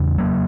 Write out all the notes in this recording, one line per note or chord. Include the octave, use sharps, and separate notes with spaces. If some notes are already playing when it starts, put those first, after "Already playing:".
Already playing: E2 C#3
F#3 A#3